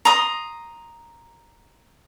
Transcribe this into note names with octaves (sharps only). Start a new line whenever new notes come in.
A#5 C6 D#6